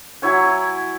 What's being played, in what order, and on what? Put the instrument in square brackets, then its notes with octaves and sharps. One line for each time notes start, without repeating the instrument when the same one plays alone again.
[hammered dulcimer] F#3 E4 C#5 G#5